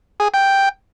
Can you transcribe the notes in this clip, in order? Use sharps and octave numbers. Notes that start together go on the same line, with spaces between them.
G#4
G5